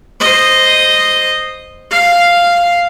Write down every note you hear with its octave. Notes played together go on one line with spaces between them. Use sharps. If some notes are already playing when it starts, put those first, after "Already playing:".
C5 D#5
F5